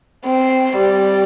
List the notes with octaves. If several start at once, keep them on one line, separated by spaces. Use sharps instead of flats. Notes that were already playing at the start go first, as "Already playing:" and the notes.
C4
G3